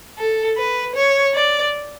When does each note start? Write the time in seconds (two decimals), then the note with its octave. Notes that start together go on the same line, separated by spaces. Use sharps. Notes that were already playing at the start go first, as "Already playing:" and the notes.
0.18 A4
0.58 B4
0.96 C#5
1.35 D5